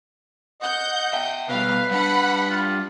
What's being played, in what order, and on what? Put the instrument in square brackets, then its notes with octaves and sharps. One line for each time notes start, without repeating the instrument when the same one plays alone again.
[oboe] D#5 [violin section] F#5 G6
[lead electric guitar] E5 G5
[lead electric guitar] B2 G3 [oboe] B4 [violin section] F5
[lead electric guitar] G3 D4 [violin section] F#5 B5
[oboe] F4